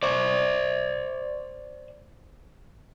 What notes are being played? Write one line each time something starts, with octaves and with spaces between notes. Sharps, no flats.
C5 D5